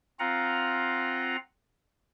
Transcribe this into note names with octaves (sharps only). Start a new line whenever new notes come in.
C4 F4 F5 F#5 A#5